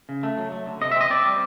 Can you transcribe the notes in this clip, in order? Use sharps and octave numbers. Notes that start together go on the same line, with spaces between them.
C#3
A3
F#3
A3
D3
C3 D#5
E5
C4 D#5
C4 D5
G3